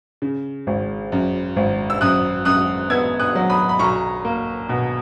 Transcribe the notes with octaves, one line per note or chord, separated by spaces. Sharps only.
C#3
G#1
F#2
G#1
E6
F#2 D#6 F#6
F#2 D#6 F#6
B3 E6 G#6
D#6 F#6
F#3
B5 D#6
B5
B1 A#5 C#6
A#3
B2